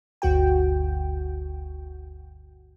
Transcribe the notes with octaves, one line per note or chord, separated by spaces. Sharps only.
G1 D2 F#4 G5